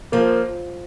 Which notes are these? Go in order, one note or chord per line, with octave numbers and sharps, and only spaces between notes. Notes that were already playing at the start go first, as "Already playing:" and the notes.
F3 A#3